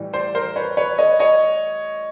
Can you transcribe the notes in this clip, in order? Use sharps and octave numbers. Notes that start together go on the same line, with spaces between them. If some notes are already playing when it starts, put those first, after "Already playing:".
Already playing: A2 E3 G3
C5 D5
A#4 C5
B4 C#5
B4 C#5
C#5 D#5
C#5 D#5